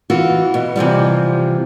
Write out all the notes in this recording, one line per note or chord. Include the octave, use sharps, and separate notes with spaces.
E3 F4 F#4
B2
C3 E3 F3 G3